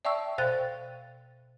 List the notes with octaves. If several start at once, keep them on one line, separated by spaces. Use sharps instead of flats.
D5 E5 G5 A5 C#6 E6
B2 C5 F5 G5 F#6 A6